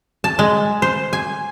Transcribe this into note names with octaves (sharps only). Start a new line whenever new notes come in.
A5
G#3
C5
G#5